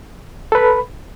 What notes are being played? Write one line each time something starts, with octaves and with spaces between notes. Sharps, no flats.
A4 B4 B5